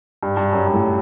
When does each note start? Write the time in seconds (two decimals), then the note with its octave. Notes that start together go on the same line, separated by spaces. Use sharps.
0.23 G2
0.37 G2
0.53 F#2
0.67 G2
0.74 A2